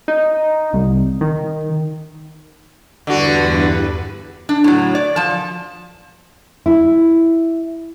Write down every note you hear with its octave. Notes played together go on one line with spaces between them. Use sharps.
D#4
C2
D#3
E2 G2 D3 F#4 B4
D4
A2 F#3
D5
F3 A5
E4